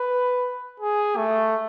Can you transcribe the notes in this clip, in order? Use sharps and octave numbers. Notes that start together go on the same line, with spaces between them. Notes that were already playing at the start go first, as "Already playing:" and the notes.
Already playing: B4
G#4
A3